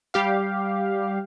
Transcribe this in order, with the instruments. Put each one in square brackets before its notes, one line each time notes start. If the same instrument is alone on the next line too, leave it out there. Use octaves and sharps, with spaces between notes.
[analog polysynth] G3 G4 F5